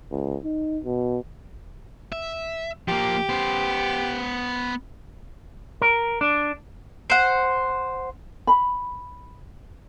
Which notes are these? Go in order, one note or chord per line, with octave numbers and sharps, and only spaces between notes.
C#2
D#4
B2
E5
F3 A#3 G4
B3 C5
A#4
D4
C5 F#5
B5